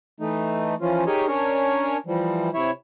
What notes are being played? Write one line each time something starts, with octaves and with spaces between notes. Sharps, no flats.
E3 A3 D#4
E3 F3 C#4 F4
D#4 G4 G#4 A#4 C#5 D#5
C#4 D4 A#4 C#5
E3 F3 G3
C3 E4 C#5 E5